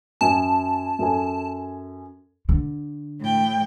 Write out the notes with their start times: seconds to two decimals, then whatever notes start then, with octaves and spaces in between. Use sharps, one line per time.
0.21 F#2 G#5 A5
0.99 F#2 A4 G#5
2.49 D3
3.20 A2 G5